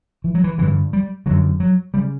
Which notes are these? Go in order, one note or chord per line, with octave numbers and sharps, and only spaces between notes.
E3
F#3
E3
G2 D3 E3
G3
F#2 D3 F#3
F#3
C#3 G3